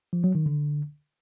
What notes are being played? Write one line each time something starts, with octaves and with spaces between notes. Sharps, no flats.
F3
F#3
D#3
D3